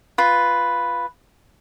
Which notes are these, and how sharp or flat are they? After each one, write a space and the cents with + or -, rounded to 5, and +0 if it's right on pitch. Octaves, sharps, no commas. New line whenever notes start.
F4 +0 B4 +0